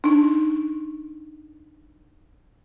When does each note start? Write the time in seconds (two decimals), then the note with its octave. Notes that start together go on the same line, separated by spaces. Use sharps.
0.04 D4 D#4